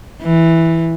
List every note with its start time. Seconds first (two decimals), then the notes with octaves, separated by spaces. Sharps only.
0.22 E3